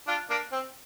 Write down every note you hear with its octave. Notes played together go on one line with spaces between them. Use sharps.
D4 F4
A#3 D4
C4